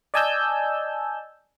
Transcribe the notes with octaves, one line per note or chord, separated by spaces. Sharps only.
D5 D#5 G#5 A5 E6 G6